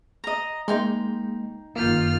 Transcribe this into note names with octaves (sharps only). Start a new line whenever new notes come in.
D#5 A#5
G#3 A#3 D#4 G5 C6
F#1 F#2 D#3 A#3 F4 F6 G6